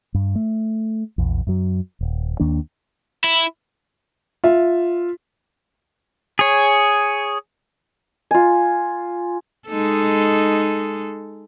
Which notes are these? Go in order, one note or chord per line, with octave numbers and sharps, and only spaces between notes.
G2
A3
A#1 E2
F#2 F#3
D#1
D#2 D#3 A#3 D4
E4
F4 E5
G#4 C#5
F4 G#5
G#3 D#4 A4